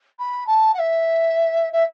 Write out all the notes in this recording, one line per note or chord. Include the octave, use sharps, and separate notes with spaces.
B5
A5
F#5
E5
E5